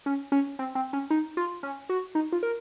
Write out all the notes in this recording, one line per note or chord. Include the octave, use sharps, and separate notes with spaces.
C#4
C#4
C4
C4
C#4
D#4
F4
C#4
F#4
D#4
F4
A#4